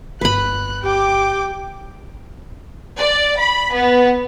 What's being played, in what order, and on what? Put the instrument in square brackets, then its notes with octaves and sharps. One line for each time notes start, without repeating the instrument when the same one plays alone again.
[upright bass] G1 F4 [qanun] B4 B5 [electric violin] F#6
[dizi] G4 [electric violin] G5 D6
[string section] D5
B5
B3